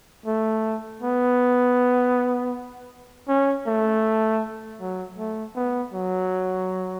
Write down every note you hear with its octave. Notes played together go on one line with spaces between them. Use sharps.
A3
B3
C#4
A3
F#3
A3
B3
F#3